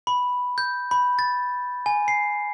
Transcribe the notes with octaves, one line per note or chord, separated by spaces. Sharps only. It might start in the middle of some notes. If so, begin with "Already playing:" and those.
B5
G6
B5
A6
G#5
C7